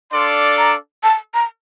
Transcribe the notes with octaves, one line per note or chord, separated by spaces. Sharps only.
D4 A4 D5 F5 C6
A#5
A5
A#5